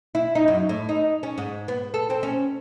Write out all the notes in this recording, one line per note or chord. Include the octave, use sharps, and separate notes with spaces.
E4
D#4
F#2
A2
D#4
C#4
G#2
B3
A4
C4
C#4